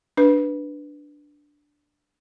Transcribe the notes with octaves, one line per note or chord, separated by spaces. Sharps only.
D4 B4